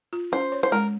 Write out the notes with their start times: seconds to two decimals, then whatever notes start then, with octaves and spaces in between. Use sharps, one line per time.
0.13 F4
0.32 C#4 C5
0.52 C#5
0.63 C5
0.72 G#3 A#4